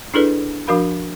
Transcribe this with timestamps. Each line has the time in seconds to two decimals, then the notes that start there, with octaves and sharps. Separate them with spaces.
0.14 D4 E4 G#4 A4 B4 D5
0.67 F3 D4 F#4 A#4 F5 B5